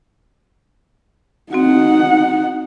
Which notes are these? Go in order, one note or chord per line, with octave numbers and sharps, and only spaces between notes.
C4 D#4 F#4 F#5